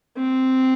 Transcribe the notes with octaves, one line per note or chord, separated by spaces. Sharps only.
C4